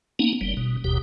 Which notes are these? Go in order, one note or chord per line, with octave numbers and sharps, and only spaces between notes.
A#3 B3 C#4 D#4
F#1 G3
B2
F#1 D#2 B2 G4